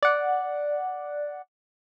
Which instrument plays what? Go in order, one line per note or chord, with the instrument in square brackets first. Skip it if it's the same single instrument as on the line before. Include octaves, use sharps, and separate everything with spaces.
[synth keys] D5 F#5